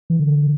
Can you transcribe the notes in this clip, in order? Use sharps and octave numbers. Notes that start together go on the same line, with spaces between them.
E3
D3